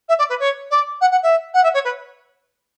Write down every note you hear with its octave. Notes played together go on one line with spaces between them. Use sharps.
E5
D5
B4
C#5
D5
F#5
F#5
E5
F#5
E5
C#5
B4